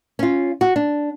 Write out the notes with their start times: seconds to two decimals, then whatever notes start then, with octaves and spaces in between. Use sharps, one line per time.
0.19 C#4 F4
0.61 F#4
0.76 D4